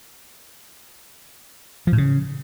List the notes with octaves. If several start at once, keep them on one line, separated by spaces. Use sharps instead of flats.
F3
A2
C#3